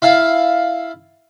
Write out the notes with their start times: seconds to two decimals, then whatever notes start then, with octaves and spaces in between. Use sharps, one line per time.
0.02 E4 F5 A5